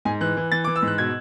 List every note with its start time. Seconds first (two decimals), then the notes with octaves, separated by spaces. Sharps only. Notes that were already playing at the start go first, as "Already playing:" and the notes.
0.05 G#2 G#5
0.21 E3 F#6
0.37 E3
0.52 E3 A6
0.64 E3 D6
0.76 E6
0.82 G#2 F#6
0.98 B2 G#6